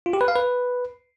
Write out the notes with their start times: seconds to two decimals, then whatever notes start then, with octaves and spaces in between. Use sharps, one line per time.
0.06 F4
0.13 G4
0.21 B4
0.28 F5
0.35 B4